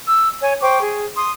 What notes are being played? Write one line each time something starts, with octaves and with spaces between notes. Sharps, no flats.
E6
C#5 G#5
C5 G5 C#6 D6
G#4
C6 D#6